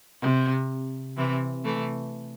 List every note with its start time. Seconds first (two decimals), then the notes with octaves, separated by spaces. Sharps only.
0.22 C3
1.17 C3 E3
1.65 E3 A3